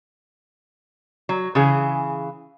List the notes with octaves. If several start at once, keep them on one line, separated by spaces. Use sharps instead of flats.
F#3
C#3 E3 G#4